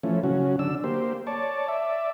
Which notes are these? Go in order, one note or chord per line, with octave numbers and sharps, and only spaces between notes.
E3 F3 A3 C#4
C#3 F#3 C#4 F#4
D3 D4 E6
A#3 G4 C5
C#5 D5 A5
D5 E5